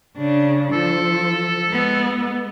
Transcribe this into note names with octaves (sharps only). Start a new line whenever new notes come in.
C#3 D4
F3 A4
G#3 B3